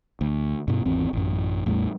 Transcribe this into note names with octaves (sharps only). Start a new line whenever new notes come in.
D2
G2 B2
G#1 E2 C4
A1 F#2
A1 E2 A2 G3